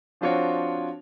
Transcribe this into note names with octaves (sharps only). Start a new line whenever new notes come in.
F3 C4 D4 F4 F#4 C#5